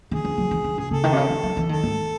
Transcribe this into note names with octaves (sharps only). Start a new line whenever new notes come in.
D#3 G#4
E3
F#3
E3
D#3
C#3 G#4
C#3 A4
D#3
C3
C#3
D#3
F#3
E3
D#3 A4
G#2